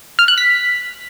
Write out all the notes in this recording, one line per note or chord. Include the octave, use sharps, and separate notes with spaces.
F6
F#6
B6